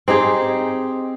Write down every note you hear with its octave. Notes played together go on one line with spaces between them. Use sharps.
C4 D#4 G4 G#4